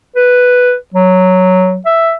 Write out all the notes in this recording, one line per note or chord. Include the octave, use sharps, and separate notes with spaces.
B4
F#3
E5